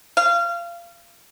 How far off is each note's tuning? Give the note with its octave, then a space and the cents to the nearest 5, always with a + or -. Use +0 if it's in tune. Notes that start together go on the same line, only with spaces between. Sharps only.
F5 -25